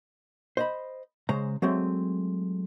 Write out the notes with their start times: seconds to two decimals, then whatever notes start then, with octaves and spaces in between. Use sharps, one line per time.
0.57 C5 D#5 B5
1.29 C#3 G#3 C5 A#5
1.62 F#3 G#3 A3 C4